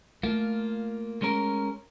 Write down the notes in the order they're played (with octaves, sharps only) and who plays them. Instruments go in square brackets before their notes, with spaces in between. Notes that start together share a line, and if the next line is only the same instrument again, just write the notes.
[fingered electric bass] A3 [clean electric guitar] A#3 F4
[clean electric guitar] G#3 C#4 A#4